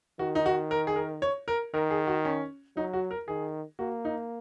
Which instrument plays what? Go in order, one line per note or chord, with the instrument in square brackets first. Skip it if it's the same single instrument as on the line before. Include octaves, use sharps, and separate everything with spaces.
[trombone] D#3 [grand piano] F#4
[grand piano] D#4
F#4
A#4
G#4
A#4
C#5
A#4
[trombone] D#3 [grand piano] A#4
[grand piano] G#4
F#4
C#4
[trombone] F#3 [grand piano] D#4
[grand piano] F#4
A#4
[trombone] D#3 [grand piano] G#4
[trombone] A#3 [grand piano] F#4
[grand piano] D#4